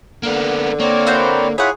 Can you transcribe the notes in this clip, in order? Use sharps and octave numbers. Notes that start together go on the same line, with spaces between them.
D3 A#3 B3
A#3 C4 C#5 D5
E4 F#4 C5
E4 F4 G#4 C#5 F#5 B5